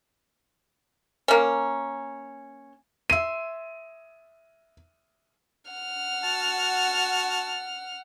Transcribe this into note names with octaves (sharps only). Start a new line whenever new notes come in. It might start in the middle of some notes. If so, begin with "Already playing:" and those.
A#3 C#4
E5 C6 D#7
F#5 F6
F#4 A5